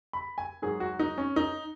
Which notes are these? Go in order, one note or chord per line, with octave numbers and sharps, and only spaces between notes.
B5
G#5
G#2 F#3 G#4
F#4
D#4
C#4
D#4